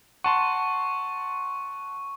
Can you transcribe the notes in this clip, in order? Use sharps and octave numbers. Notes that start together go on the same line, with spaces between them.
F#5 A5 C6 C#6